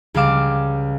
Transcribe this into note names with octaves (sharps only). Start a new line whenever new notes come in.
C#2 G3 F5 D6 E7